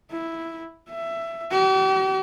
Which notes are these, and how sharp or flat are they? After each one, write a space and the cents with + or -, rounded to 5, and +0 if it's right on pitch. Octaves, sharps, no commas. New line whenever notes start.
E4 +0
E5 +15
G4 -45